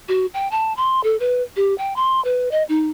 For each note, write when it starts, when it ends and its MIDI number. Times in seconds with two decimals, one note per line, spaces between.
0.09 0.26 66
0.34 0.50 79
0.51 0.73 81
0.77 1.03 84
1.04 1.19 69
1.20 1.43 71
1.56 1.76 67
1.78 1.94 79
1.96 2.23 84
2.25 2.49 71
2.51 2.63 75
2.69 2.90 63